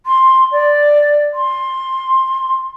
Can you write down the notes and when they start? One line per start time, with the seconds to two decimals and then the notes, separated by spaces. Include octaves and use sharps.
0.06 C6
0.52 D5
1.34 C6